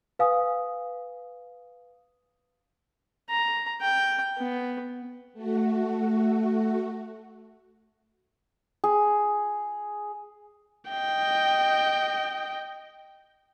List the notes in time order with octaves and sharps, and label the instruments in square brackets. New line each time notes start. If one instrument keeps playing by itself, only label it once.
[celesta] B4 F5 G#5 D#6
[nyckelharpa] A#5
G5
B3
[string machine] A3 F#4
[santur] G#4
[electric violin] D#5 G5